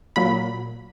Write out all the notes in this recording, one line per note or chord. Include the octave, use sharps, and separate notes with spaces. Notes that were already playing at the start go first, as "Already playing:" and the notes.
A#2 F#3 B5